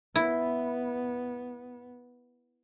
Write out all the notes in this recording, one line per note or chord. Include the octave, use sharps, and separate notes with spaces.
B3 E4